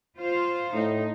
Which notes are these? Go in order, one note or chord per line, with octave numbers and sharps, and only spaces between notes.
F4 C5 F5
A2 D#4